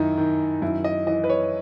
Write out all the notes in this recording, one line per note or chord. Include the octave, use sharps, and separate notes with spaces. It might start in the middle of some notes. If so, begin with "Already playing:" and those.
Already playing: F#2 D#3 D#4 E4
D#3
F#2 E4
D#5
E3 D#5
B4
C#5